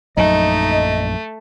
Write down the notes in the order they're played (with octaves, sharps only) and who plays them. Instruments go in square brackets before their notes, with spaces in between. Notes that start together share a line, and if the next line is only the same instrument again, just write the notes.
[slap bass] A#1 F#2 F#3 [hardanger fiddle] A3 [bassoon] D#4 [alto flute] D#5